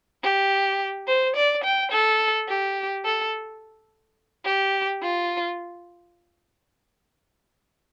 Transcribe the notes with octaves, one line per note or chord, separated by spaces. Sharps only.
G4
C5
D5
G5
A4
G4
A4
G4
F4